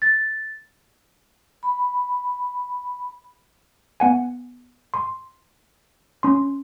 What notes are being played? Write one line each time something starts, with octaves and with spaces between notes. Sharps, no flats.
A6
B5
B3 F#5 G#5
C6
C#4 C6